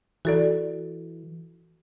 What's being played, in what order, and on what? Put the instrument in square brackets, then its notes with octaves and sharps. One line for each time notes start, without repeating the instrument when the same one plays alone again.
[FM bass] E3 [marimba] F#4 A4 D5